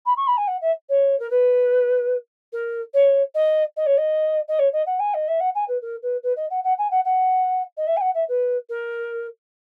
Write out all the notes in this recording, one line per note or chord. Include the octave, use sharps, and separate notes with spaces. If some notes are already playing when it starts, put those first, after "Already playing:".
B5
C#6
B5
G#5
F#5
E5
C#5
A#4
B4
A#4
C#5
D#5
D#5
C#5
D#5
D#5
C#5
D#5
F#5
G#5
D#5
E5
F#5
G#5
B4
A#4
B4
B4
D#5
F#5
F#5
G#5
F#5
F#5
D#5
E5
G#5
F#5
E5
B4
A#4